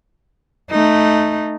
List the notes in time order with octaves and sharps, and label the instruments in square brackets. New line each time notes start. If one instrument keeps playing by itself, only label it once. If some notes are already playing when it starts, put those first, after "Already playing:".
[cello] A3 D#4